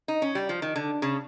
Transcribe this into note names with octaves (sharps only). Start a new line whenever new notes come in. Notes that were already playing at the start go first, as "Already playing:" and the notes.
D#4
C#4
G3
F3
D#3
D3
C#3